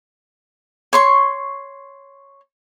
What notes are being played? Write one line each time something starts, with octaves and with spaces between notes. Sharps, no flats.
C#5 C6 C#6